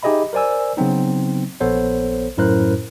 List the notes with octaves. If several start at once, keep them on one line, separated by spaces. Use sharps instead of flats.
D#4 G4 G#4 D#5 E5 B5
A#4 C5 D5 G#5 E6
C#3 F#3 B3 C4 D#4
A#1 B3 A4 C5 C#5
F#2 A2 E4 A#4 C5 F#6